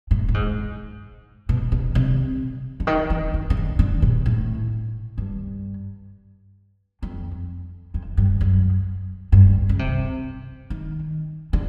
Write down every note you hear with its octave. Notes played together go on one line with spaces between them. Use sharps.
A2
A2
G#2
B2
B2
C3
D3
D#3
E3
D#3
C#3
D3
D3
A#2
A2
G2
F2
F2
G2
F#2
G2
C#3
C3
D#3
D3